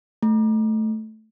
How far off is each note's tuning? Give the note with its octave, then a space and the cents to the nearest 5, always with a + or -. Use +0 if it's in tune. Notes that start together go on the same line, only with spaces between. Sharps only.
A3 -5